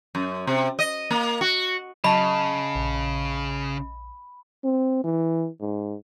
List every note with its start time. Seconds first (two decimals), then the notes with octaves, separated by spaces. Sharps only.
0.15 F#2
0.47 C3
0.79 D#5
1.11 A#3
1.41 F#4
2.04 C#3 F#3 D#5 A5 B5 C#6
2.75 A#1
4.64 C4
5.04 E3
5.60 G#2